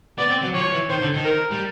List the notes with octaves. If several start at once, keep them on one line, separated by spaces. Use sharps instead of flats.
B3 D5
C4
F#3
F3 C#5
E3
D#3 C5
D3
D#3
A#4
G3